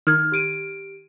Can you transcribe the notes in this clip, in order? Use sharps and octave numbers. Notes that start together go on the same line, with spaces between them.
D#3 F6 G#6
G4 D7 D#7